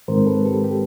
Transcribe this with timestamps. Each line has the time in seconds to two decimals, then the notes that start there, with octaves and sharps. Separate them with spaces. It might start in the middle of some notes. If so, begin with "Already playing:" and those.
0.08 G#2 D#3 G#3 C4 A#4 C5
0.27 A4 B4
0.45 G4 A4
0.64 G4